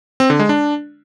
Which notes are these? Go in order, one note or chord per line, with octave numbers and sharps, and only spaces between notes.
C4
D3
G#3
D4